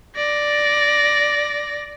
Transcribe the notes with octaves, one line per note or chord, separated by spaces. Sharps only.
D5 A#6